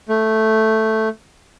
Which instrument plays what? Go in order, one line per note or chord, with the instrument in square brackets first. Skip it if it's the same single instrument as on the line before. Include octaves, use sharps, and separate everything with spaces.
[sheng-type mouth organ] A3